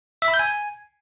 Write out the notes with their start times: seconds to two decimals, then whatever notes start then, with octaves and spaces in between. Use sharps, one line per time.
0.22 E5
0.28 B5
0.34 G6
0.39 G#5